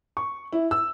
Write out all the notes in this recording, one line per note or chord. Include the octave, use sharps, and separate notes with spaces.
C#6
E4
E6